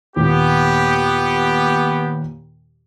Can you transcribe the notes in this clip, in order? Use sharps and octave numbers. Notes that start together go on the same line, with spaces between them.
D#2 A#2 B3 G4